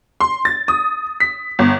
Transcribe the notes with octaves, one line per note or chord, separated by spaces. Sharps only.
C6
A6
D#6
B6
G1